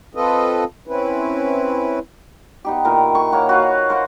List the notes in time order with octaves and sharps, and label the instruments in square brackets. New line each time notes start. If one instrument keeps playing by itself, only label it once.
[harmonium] C4 F4 A4 B4 D#5
C4 C#4 E4 B4
[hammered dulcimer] B3 D#4 G4
A#2 D#3 E4 A#4
C#6
A#3 C#5 F#5
F#4 B4 F5
A#4 C5 F5 F#5